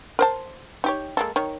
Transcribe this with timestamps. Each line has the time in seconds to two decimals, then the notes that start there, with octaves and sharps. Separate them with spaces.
0.19 A#4 C5 A5
0.84 D#4 G4 C#5
1.17 G#3 A#3 A4
1.36 D#3 C#5